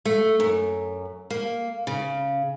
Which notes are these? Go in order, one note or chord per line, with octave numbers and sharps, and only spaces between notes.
A3
F#2
A#3
C#3